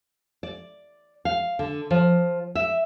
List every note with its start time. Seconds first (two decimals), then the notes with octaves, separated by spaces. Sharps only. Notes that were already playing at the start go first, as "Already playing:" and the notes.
0.43 D5
1.25 F5
1.59 D3
1.91 F3
2.55 E5